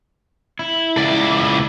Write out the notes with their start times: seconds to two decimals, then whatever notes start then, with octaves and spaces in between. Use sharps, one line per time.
0.59 E4
0.97 C#2 D5